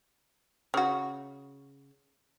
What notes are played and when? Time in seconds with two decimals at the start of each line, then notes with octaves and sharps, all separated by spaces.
0.74 C#3 F#4